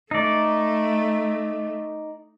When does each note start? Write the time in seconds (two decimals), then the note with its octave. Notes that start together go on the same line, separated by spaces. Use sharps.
0.11 A3 D#4 D5